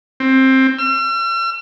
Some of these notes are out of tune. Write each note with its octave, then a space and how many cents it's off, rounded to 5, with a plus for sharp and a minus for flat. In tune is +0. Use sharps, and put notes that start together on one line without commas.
C4 +15
E6 +45